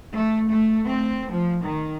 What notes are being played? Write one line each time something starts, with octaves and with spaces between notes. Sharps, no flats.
A3
A3
C4
F3
D#3